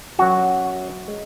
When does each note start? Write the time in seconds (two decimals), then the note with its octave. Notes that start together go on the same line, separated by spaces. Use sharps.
0.19 F#2 F#3 F#4
1.08 G#3